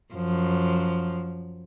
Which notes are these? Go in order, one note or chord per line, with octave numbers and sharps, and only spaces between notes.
F#2 F3